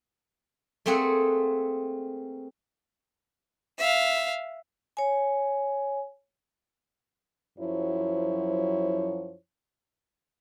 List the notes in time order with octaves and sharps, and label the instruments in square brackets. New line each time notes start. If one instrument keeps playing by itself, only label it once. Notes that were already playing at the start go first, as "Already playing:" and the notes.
[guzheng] A3 A#3 C4 G#4 A4 F#5
[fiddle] E5 F5
[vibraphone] C#5 G#5
[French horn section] F#2 F3 F#3 E4 C5 C#5